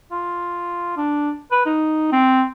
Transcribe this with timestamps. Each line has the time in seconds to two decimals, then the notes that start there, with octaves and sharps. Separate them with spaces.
0.11 F4
0.97 D4
1.51 B4
1.66 D#4
2.12 C4